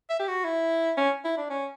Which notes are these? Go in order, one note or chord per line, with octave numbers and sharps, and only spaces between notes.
E5
G4
F#4
E4
C#4
E4
D4
C#4